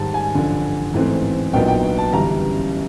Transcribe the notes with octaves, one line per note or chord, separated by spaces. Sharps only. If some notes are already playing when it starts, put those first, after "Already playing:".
Already playing: G#2 D#3 G3 A5
G#5
A1 G2 D3 F3
A1 G#2 E3 A3 C4
A#1 A#2 F#3 B3 D#4 G5
G5
A5
G1 F#2 C#3 E3 G3 A#5